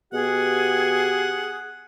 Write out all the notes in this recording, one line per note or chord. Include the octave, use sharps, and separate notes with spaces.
B2 G4 G#4 F#5